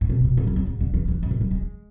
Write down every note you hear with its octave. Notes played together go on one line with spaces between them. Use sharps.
A2
B2
B2
G#2
F#2
E2
G#2
D3
E3
E3
F#2
A2
F#3
G#3